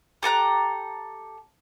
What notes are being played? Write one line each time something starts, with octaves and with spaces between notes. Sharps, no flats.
G4 A4 A#5 F#6